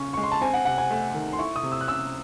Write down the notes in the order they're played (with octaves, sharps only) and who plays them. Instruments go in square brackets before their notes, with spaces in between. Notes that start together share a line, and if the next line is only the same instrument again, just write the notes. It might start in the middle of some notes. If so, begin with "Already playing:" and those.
Already playing: [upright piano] C#3 C#4 [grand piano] C#6
[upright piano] G#3 [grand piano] C#6
[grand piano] C6
A5
[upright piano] C4 [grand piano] G#5
[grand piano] F#5
[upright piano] C3 [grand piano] F#5
[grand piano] G#5
[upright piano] A3
D#3
[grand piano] C6
[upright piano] E4 [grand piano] C#6
[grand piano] D#6
[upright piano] C3
[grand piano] E6
F#6
[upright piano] C#4 [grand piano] E6